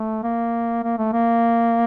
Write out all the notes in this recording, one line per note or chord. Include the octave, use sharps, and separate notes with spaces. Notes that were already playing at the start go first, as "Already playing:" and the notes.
Already playing: A3
A#3
A#3
A3
A#3